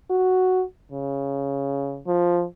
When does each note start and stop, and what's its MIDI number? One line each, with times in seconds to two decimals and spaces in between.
0.10 0.63 66
0.92 2.01 49
2.06 2.44 53